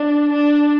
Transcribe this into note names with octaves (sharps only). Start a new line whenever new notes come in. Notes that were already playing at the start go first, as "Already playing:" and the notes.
Already playing: D4
D4